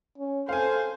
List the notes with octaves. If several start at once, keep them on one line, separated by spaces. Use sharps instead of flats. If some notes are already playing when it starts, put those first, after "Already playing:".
C#4
A4 C5 F5 G#5